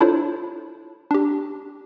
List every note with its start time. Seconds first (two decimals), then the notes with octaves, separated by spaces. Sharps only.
0.01 D4 E4 F4 A4 C5 C#5
1.11 D4 G4